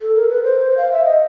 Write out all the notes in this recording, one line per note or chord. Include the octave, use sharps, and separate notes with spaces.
A4
A#4
B4
C5
F5
E5
D#5